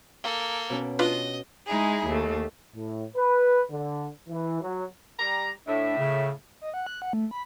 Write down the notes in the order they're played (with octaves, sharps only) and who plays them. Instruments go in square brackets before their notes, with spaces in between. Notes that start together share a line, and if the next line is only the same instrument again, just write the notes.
[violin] A#3 A4
[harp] B2 C#4
[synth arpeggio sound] D4 F4 B4 [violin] D#5
[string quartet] G#3 D#4 E4 G#4
D#2 A3
[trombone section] A2
B4
D3
E3
F#3
[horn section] G3 A#5
[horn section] A2 [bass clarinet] D4 [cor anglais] E5
[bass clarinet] C#3
[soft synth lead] D#5
F#5
F#6
F#5
A3
B5